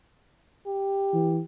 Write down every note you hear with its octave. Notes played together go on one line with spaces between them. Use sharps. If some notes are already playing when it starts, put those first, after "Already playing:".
G4
E3